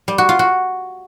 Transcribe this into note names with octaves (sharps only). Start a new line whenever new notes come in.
G3
F#4
F4
F#4